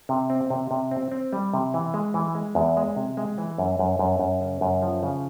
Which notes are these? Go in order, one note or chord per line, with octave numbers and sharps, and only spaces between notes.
C3
C4
C3
C3
C4
C4
G3
C3
E3
G#3
E3
G#3
E2
G#3
C3
G#3
E3
F#2
F#2
F#2
F#2
C#3
F#2
F3
C#3